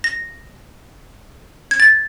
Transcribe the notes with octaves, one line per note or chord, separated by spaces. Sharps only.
A#6
G#6
A6